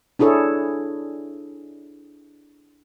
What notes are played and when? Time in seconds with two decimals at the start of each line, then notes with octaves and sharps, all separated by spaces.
0.19 D4 E4 G#4 A4 C#5